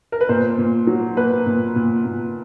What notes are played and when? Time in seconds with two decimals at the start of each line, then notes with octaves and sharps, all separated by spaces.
0.12 A#4
0.21 B4
0.29 A#2 C5
0.58 A#2
0.87 F#3
1.17 A#3 B4
1.46 A#2
1.76 A#2
2.05 A#2